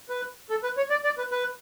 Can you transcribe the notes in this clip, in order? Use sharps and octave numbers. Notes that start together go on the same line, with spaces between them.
B4
A4
B4
C#5
D5
D5
B4
B4